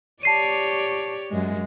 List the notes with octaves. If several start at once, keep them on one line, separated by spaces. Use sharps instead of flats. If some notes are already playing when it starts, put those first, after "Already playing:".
G4 C#5 D5 A5 C7 D#7
F#2 G#3